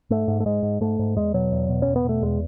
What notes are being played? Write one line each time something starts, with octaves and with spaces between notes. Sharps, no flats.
G#2 A3
G#2
A3
G#2 G#3
G#2
G#2 A3
G#2
E2 G#3
B2 F#3
E2
B2
E2 C#4
B3
B2 A3
E2 G#3